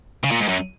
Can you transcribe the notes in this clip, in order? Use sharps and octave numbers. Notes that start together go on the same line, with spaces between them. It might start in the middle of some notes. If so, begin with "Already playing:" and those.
C#3
A#2
G#2
F#2